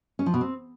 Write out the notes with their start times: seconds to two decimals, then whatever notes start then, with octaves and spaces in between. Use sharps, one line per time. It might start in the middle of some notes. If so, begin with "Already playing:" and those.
0.19 C#4
0.26 F3
0.34 B2
0.41 C4